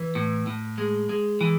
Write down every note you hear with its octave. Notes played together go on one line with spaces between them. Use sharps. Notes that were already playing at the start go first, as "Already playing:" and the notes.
Already playing: E3
A2
A2
G#3
G#3
E3